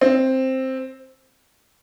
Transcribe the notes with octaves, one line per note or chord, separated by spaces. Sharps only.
C4